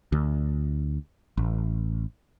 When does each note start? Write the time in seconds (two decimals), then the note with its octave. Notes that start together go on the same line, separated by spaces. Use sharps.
0.12 D2
1.37 A1